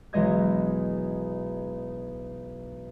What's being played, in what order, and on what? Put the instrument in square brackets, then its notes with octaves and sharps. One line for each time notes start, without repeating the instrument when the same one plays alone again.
[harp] B1 E3 G#3 D#5 G#6